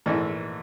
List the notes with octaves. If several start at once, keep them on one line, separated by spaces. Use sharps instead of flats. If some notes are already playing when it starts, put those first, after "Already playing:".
A#1 G#2 E3 A3